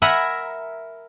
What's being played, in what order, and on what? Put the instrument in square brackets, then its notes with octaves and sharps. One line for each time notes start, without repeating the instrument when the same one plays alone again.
[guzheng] A#4 E5 F#5 G#5 A#5 B5